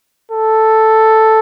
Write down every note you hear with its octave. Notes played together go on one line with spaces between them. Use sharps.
A4